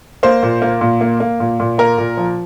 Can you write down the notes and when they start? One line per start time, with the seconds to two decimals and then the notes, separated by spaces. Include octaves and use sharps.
0.23 A#3 C5
0.43 A#2
0.62 A#3
0.81 A#2
1.01 A#3
1.20 A#3
1.40 A#2
1.60 A#2
1.78 A#3 A#4
1.98 A#2
2.17 F3